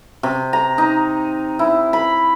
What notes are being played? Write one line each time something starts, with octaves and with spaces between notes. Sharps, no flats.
C3
A#5
D#4
E4
B5